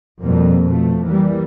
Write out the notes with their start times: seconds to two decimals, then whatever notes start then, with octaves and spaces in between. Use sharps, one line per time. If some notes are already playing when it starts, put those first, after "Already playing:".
0.21 F2 B2 G3 A#3
0.67 B2 F3 A3
1.06 E3 G3 A#3